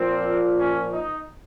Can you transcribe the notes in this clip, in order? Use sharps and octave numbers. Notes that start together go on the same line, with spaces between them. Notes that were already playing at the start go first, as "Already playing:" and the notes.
Already playing: A#2 F3 A#3 C4
C#4
D#4